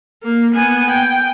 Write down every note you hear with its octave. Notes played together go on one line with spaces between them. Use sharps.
A#3
B3 G#5
G5